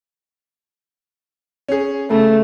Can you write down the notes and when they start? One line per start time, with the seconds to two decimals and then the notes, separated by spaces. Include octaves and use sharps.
1.68 C#4 G#4
2.11 C#3 A3